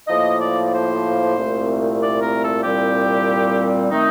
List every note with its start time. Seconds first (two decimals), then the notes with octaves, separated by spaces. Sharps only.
0.08 A2 F3 A#3 D#5
0.40 D5
0.64 D5
0.72 C5
1.36 C2 A#2 A3 C4
2.00 D5
2.21 A#4
2.42 A4
2.63 C2 A#2 G3 C4 G4
3.90 D#3 A3 C4 D#4